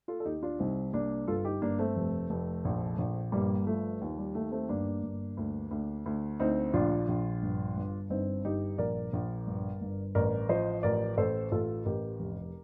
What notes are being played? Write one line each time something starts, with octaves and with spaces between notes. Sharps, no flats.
F4 A4
A4
D#2 D#4 G4
D4 F4
C2 C4 D#4
C2 A#3 D4
G1 F4 A4
D#4 G4
G1 A#3 D4
A3 C4
F1
F1
A#1
A#1
G1 G3 A#3
F3 A3
D#2
G3
D#2 A3
A3 C4
G1 A#3 D4
G1
D2
D2
D2
D2 C4 D#4
A#1 D4 F4
A#1
G1
G1
G1 C4 D#4
G1 D#4 G4
A#1 A#4 D5
A#1
G1
G1
A1 A#4 D5
F3 C5 D#5
A1 A#4 D5
A1 A4 C5
A1 F4 A4
A1 G4 A#4
F1